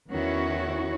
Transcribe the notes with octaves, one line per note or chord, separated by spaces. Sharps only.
E2 D#3 C#4 E4 F#4 C#5